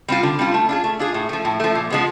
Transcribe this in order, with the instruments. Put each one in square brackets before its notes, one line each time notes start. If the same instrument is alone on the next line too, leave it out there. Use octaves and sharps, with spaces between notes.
[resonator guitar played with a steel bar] G3 C4 F4
D3
G3 C4 F4
A3
D4 F4 G#4
A3
D4 F4 G#4
A2
F3 A3
A2
F3 A3
A#2
F3 G#3 B3